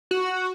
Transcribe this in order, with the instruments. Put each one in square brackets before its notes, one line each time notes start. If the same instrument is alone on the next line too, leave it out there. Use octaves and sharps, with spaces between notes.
[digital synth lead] F#4